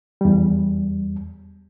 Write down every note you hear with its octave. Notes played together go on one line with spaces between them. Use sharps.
E2 G3